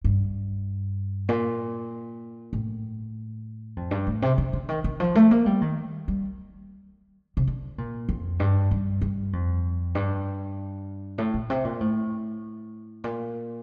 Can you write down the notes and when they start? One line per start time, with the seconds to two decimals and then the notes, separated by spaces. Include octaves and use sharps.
0.04 G2
1.29 A#2
2.53 A2
3.77 F2
3.91 G2
4.07 A2
4.22 C3
4.38 D3
4.53 D3
4.69 D#3
4.84 D#3
5.00 F3
5.15 A3
5.31 A#3
5.46 G3
5.62 D#3
6.08 G3
7.37 C3
7.47 D3
7.78 A#2
8.09 F2
8.40 G2
8.71 G2
9.01 G2
9.33 F2
9.95 G2
11.18 A2
11.34 A#2
11.50 C3
11.64 A#2
11.81 A2
13.04 A#2